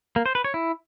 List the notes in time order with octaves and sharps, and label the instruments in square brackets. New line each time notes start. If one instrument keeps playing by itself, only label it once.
[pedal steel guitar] A#3
C5
B4
C#5
E4